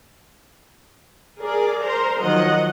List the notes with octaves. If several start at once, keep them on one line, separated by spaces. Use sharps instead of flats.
G#4 A#4 D5
A#4 C5 A#5 C6
D#3 F3 F#3 D#5 F#5